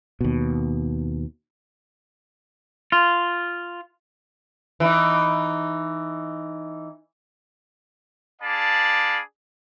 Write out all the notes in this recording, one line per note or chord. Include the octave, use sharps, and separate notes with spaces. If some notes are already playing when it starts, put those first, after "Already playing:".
D#2 B2
F4
E3 D#4
D4 G#4 D5 F5 A5 B5